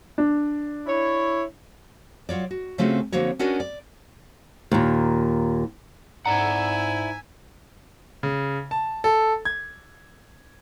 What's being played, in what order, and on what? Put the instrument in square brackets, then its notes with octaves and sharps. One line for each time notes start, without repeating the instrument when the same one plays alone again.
[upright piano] D4
[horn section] E4 C#5
[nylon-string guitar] F#3 F4 C#5 D5
F#4
C#3 A3 C4 C#4 F4 F#4
D3 F3 A#3 C4 F#4 C#5
B3 C#4 D4 F#4 A#4
D5
D#2 A#2
[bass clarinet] G#2 [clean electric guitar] E4 D5 F#5 [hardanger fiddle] E5 G#5 [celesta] A#5
[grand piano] C#3
A5
A4
G#6